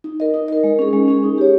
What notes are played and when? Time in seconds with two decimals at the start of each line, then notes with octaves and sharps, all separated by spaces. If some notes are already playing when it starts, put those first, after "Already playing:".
0.04 D#4
0.20 A#4 D#5
0.34 D#4
0.48 A#4 D#5
0.64 G#3
0.79 C#4 G#4
0.93 G#3
1.08 C#4 G#4
1.23 D#4
1.38 G4 C#5